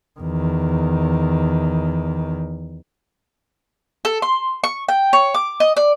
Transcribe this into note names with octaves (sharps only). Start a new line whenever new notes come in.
E2 D#3
A4
C6
C#6
G5
C#5
D6
D#5
D5